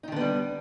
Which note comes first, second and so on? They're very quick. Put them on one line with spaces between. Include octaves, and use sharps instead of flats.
D#4 D#3 D3 B3 G3